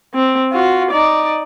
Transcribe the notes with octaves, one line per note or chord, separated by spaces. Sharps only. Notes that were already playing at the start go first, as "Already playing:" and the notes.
C4
F4 F#4
D#4 D5